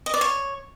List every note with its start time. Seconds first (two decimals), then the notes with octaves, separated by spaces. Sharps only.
0.06 D#5
0.14 D5
0.21 C#5